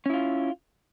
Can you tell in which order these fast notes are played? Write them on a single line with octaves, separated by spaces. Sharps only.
C#4 E4 F4